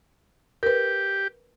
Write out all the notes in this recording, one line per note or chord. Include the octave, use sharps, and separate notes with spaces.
G4 A#4 B4